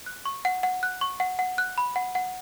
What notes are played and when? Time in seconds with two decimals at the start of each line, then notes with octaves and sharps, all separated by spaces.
0.06 F#6
0.25 C#6
0.45 F#5
0.63 F#5
0.83 F#6
1.01 C#6
1.20 F#5
1.39 F#5
1.58 F#6
1.78 B5
1.96 F#5
2.15 F#5